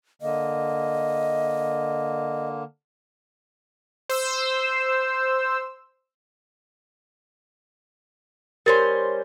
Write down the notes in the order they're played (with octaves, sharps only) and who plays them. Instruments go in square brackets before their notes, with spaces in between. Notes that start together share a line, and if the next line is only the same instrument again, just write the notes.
[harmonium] D3 A#3 [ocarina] D#5
[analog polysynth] C5 E6
[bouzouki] G3 C#4 C5 [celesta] A#4 A6